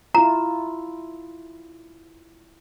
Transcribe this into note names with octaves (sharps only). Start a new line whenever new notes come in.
E4 F4 A#5